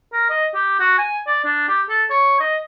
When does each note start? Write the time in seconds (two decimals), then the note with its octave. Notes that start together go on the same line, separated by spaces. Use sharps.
0.13 A#4
0.29 D#5
0.54 G4
0.80 F#4
0.98 G#5
1.27 D5
1.45 D4
1.68 G4
1.89 A4
2.10 C#5
2.40 D#5